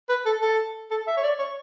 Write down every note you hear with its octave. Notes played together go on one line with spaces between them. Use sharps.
B4
A4
A4
A4
E5
C#5
D5
C#5